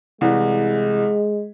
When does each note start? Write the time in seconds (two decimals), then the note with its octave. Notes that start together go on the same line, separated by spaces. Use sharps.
0.21 C2 E3 G#3